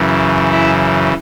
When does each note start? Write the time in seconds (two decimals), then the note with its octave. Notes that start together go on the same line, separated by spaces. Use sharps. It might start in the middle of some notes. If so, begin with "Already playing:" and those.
Already playing: F#2 C#3 E3
0.52 E4 E5